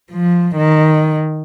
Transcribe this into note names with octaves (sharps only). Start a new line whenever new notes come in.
F3
D#3